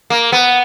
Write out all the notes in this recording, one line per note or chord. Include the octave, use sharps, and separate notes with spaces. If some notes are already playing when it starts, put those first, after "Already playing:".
A#3
B3